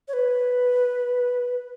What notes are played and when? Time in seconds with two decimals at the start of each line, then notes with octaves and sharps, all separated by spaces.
0.08 C#5
0.13 B4